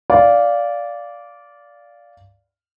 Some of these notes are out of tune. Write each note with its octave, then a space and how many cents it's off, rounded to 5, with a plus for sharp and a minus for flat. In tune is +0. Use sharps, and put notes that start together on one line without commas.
D5 -15 F5 +0